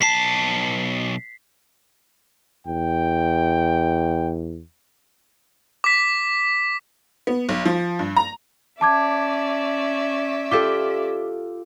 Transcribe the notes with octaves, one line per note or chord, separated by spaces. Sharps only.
B1 A5 B6 C7
E2 G5
D6 B6
B3
B1
F3
G2
A#5
C#4 D5 E5 A5 D6 G#6
F4 G4 A4 D6 B6 G7